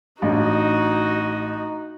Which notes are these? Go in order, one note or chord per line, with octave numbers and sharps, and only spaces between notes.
A1 D4 D#4 F#4